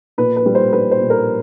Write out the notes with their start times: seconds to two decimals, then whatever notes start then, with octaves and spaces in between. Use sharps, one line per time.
0.18 A#2 B4
0.36 B4
0.46 G3
0.55 C5
0.73 G3 B4
0.91 C5
1.01 A#2
1.10 A#4